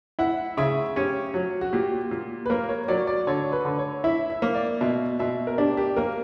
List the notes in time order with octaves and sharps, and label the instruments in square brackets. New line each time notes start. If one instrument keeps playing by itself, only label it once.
[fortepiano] E4 [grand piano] F#5
[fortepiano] C#3 [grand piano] E5
[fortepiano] C#4 [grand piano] G4
[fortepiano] F#3
[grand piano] F#4
[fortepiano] A#2 [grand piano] G4
[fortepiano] A#2
[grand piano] B4
[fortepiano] A#3 [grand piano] A#4
[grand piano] C#5
[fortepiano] F#3 [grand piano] D5
[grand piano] D5
[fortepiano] D3 [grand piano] C#5
[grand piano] B4
[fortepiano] D3
[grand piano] C#5
[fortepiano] E4 [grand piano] E5
[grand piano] E5
[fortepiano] A#3
[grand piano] D5
[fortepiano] B2 [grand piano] E5
[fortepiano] B2 [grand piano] E5
[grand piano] A#4
[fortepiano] D4 [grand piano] G4
[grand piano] G4
[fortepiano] A#3 [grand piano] A#4